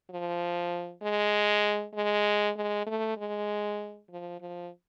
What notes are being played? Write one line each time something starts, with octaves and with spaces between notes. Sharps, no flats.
F3
G#3
G#3
G#3
A3
G#3
F3
F3